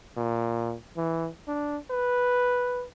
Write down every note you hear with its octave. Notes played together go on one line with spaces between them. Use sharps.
A#2
E3
D4
B4